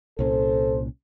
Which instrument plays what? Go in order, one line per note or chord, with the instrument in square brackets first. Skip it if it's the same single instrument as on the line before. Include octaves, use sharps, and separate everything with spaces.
[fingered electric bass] C2 A#2 C#4 [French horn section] A4 C5